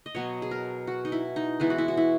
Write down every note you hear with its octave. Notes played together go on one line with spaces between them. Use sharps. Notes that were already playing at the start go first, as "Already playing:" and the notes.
D#5
B2 F#3 B3 C#5
G#4
A#4
F#4
D#4
E4
D#4
E3 G#3 B3 E4
F#4
E4
F#4
E4